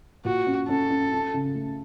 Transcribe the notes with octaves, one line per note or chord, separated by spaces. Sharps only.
A#2 F#4
C#4
C#4 A4
C#4
C#4
C#3
A3